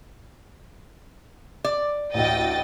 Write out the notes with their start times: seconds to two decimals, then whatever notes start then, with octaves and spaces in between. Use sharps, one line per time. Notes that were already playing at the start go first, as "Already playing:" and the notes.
1.64 D5
2.14 A1 D2 D#5 G5 A6